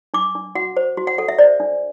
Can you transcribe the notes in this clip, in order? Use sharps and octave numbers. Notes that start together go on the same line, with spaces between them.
D4 D6
D4
F#4 F#5
C5
F#4
F#5
A4 F#5
E5
C5 D5
D4